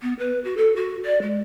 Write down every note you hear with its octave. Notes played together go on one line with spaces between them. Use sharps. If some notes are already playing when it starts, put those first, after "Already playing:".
B3
B4
F#4
A4
F#4
D5
G#3